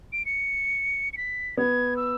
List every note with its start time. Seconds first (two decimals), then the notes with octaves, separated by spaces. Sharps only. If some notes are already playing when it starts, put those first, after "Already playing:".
0.12 D7
0.25 C#7
1.13 C#7
1.17 B6
1.57 B3 G#6
1.97 E6